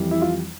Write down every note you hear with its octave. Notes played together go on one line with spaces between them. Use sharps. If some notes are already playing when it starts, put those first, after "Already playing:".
Already playing: F2 E3 G3
E4
F4